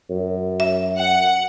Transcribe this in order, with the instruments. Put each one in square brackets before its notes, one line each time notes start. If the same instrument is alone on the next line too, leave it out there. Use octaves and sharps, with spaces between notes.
[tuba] F#2
[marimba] E5
[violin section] F#5